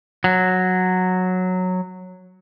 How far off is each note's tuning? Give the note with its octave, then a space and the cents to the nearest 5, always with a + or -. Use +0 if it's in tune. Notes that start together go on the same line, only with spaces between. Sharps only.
F#3 -10